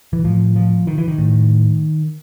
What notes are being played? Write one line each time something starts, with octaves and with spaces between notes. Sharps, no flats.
E3
A2 F3
F3
D#3
E3
D#3
A2